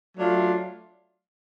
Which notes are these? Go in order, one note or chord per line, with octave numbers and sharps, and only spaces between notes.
F#3 A3 D4 F4